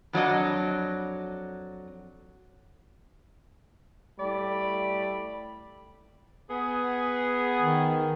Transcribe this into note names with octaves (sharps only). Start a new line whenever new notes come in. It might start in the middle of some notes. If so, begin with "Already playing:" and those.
F2 F#3 D4 D#5
A2 G3 A3 D5 B5
B3 G#4
D#3